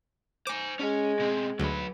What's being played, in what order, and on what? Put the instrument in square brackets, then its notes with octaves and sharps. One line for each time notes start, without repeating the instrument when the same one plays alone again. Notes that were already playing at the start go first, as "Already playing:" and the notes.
[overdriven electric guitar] C5 G#5 [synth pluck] D6
[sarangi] G#3 [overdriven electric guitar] C#4
[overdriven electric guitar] B2 C4
[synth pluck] D2 [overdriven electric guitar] F#3 B4